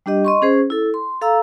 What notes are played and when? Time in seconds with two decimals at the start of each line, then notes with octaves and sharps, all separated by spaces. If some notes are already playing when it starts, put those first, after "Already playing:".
0.06 G3 D4 G4 D#5
0.25 D#5 C6 C#6
0.42 C#4 G#4 C5
0.70 E4 A4
0.94 C6
1.21 A4 F5 A#5 E6